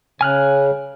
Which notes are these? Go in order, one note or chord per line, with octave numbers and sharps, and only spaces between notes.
C#3 G#5 F6 F#6